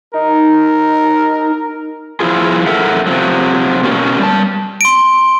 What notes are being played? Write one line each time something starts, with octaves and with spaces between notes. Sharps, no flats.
D#4 A#4
F3 E4 F4 G#4
F#2 A4 A#4 E5 F#5
C3 F3 F#3
B2 A#3 C#4
G3 A5
C6 D7